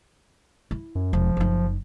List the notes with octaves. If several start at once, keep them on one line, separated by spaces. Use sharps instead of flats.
E4
F#2
E1 F3
F#1 D#4